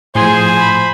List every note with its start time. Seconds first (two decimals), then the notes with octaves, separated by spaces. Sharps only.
0.15 A2 F3 G#4 C5 G#5 C6 G#6
0.60 B5